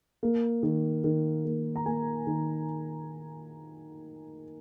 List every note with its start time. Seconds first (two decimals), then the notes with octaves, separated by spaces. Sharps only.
0.23 A#3
0.63 D#3
1.04 D#3
1.45 A#3
1.76 A#5
1.86 A#3 G#5
2.27 D#3